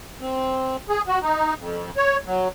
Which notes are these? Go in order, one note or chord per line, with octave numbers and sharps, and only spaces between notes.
C4
G#4
F#4
D#4
F2
C#5
F#3